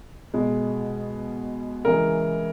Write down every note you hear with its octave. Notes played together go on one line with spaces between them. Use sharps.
B2 G#3
C#3 E3 G#3 A#4